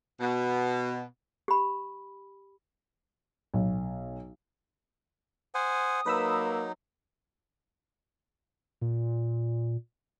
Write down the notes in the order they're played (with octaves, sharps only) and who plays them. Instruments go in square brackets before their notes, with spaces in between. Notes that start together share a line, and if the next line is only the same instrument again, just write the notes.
[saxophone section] B2
[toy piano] G4 B5
[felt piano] B1
[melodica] C5 F#5 G#5 [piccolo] D#6
[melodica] F#3 D#4 [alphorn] A#3 [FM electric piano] B4 B5 E6
[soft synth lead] A#2